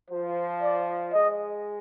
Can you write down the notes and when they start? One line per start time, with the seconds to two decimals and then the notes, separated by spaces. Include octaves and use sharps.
0.10 F3 C5
0.62 D5
1.13 G#3 D#5